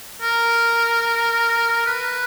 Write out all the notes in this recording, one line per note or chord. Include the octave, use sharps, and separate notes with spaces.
A#4
B4